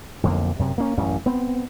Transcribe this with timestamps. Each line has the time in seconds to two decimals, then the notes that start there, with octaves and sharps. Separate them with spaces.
0.23 B1 F2 D3 A#3
0.59 F#2 C3
0.78 A#3 C#4
0.97 A1 F#2 C#4
1.26 B3 C4